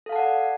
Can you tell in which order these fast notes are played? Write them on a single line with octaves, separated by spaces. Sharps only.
A4 F5 A5 F#5 D5